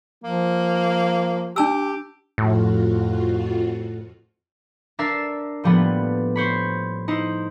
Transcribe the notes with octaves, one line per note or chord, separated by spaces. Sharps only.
F3 A#3
D4 G4 A5 E6
F2 A2 F4 F#4
D4 A#4 E5 E6 A6 C7
A2 F3 G3 A#3 B3
C5 C#5 B5
D#4 E4 C5